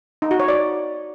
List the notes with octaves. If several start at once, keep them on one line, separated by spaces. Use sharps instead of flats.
D#4
F#4
C#5
D5